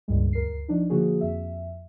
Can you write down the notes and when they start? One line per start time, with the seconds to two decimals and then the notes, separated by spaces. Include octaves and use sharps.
0.08 C#2 G2 A#2 G3 G#3
0.33 D2 A#4 C7
0.68 F3 D4 D#4
0.90 D3 F3 A#3 F#4 G#4
1.21 F2 E5